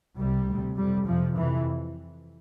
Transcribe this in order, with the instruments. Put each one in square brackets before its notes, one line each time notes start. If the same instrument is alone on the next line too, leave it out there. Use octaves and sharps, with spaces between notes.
[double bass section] C2 C3 G3
D2 C3
F2 C3 G3
F2 C3 F3
F2 C3 E3